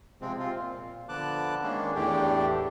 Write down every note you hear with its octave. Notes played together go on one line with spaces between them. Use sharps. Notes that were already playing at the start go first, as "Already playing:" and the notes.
C3 F3 G#3 C4
C4 F4
A#2
D3 F3 B3 A5 D6 F#6
D#3 G#3 A#3 C#4 D4
E2 A2 A3 D4 G4